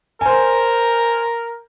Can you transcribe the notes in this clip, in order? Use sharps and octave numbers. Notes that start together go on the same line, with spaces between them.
A#4 C5 G#5